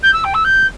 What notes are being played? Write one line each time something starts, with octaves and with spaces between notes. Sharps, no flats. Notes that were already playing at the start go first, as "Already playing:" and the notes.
G6
E6
G5
E6
G6